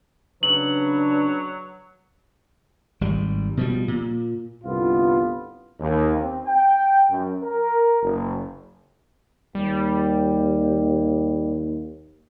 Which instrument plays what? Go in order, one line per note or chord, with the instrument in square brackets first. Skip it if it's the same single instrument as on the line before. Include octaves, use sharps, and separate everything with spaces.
[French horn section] C#3 D4 B4 [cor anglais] F#3 [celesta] F#7
[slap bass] G#1 G3
B2 F3 G3
A#2
[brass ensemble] G1 C2 A3 B3 F4
D#2
C4
G5
F#2
A#4
F#1
[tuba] D#2 [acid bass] G3